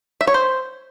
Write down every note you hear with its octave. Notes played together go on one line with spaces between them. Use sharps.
E5
C#5
C5